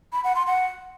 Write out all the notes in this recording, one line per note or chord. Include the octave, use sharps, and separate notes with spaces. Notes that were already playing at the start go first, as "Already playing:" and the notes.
B5
F#5
C6
F#5